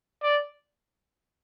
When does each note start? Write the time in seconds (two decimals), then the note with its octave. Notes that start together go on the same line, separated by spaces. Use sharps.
0.23 D5